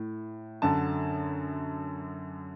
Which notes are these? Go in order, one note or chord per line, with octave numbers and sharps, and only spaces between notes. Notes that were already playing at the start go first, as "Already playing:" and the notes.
Already playing: A2
F#2 D3 A5